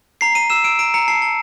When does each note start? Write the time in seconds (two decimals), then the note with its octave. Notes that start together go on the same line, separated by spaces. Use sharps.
0.21 A#5 C7
0.35 A#5 D#7
0.50 E6 E7
0.64 E6 D7
0.79 A#5 D7
0.94 A#5 C#7
1.08 A5 C7
1.22 A5